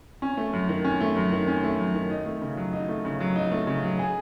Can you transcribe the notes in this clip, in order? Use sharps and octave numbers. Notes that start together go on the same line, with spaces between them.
C#4
A3
F#2
D#3
C#4
A3
F#2
D#3
C#4
A3
F#2
D#3
D#4
A3
C#3
F#3
D#4
A3
C#3
F#3
D#4
A3
C#3
F#3
G#4